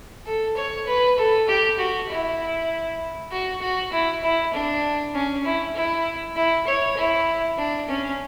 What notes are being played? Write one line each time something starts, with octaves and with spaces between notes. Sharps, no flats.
A4
C#5
B4
A4
G4
F#4
E4
F#4
F#4
E4
E4
D4
C#4
E4
E4
E4
C#5
E4
D4
C#4